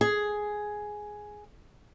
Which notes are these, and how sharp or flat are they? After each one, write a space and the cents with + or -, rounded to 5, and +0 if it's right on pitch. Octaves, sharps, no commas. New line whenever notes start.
G#4 +5